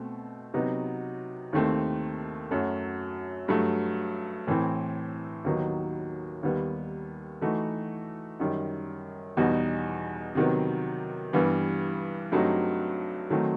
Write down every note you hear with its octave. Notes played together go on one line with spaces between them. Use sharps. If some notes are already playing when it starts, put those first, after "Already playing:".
Already playing: B2 A3 C4
C3 F#3 B3 D#4 F#4
D#2 D#3 A3 C4
F#2 F#3 A3
G2 F#3 A3
A2 E3 A3 C4
D#2 D#3 F#3 B3 D#4
D#2 D#3 G3 B3
E3 A3 D#4 F#4
F#2 D#3 G3
E2 B2 G3 D#4 F#4
C3 D#3 F#3 B3
G2 E3 G3 B3
G2 F#3 A3 C4 D#4
D#3 F#3 A3 C4 D#4